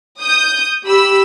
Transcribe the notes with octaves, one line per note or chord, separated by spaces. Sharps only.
D#6 G6
G4 B5 E6